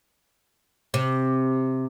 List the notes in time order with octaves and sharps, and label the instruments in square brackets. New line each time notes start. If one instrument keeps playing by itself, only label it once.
[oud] C3